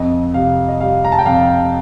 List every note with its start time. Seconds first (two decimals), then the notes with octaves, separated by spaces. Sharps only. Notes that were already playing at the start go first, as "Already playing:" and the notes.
Already playing: F2 D#5
0.34 C3 F5
0.69 D#5
0.80 G3 F5
1.05 A#5
1.12 A5
1.19 G5
1.26 F2 F5